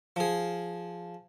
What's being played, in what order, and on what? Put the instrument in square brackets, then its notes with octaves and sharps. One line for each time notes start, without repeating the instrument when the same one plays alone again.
[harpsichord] F3 G#4